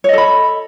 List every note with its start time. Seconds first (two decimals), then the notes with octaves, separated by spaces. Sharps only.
0.04 C#5
0.09 D#5
0.13 A4
0.18 B5